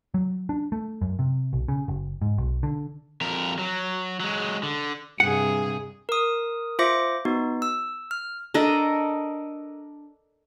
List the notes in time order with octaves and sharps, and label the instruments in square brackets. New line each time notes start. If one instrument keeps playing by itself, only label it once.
[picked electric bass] F#3
D4
A3
F#2
C3
B1
C#3
F#1
G#2
B1
D3
[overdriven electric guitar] F2 A#4
F#3
F#3 G#3
D3
[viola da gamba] G2 C3 G#4 [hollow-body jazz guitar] F#5
[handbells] A#4 D#6
F4 C5 E5 D6 A#6 C#7
B3 D#4 F#4
E6
F6
[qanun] D4 A4 A#4 D#5